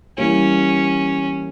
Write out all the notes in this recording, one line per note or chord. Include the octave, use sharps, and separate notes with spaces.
E3 G3 A#3 C#4